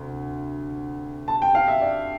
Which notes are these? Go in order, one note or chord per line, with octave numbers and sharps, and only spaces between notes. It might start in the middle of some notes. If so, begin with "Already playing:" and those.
Already playing: D2 C3
A5
G5
F5
E5
D5